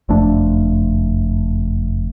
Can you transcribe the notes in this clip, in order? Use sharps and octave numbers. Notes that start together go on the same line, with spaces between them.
F#1 F2 A3 D4